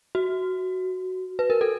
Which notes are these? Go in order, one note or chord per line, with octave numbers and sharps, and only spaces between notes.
F#4
B4
A#4
A4